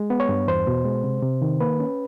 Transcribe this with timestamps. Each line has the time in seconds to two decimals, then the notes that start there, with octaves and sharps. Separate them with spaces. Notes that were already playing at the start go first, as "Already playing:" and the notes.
Already playing: G#3
0.10 B3
0.20 C#5
0.29 G2
0.48 E2 C5
0.67 B2
0.85 G#3
1.04 C3
1.23 C3
1.42 D#3
1.60 A#3 B4
1.80 C#4